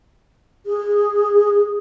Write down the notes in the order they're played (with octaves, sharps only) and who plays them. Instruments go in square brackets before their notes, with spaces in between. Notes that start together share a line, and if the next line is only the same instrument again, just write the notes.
[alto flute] G#4